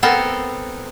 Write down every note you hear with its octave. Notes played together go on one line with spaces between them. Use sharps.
B3 C4 A4 A#4